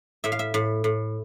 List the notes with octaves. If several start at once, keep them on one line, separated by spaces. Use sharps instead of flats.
A2 E5
F5
E5
A2
A2